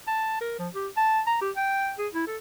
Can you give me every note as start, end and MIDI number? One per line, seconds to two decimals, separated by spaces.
0.07 0.41 81
0.41 0.58 70
0.59 0.68 53
0.74 0.88 67
0.97 1.21 81
1.27 1.37 82
1.41 1.51 67
1.56 1.92 79
1.98 2.08 68
2.13 2.26 64
2.27 2.37 69